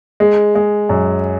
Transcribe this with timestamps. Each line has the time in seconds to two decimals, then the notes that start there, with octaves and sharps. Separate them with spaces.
0.20 G#3
0.55 G#3
0.89 F#2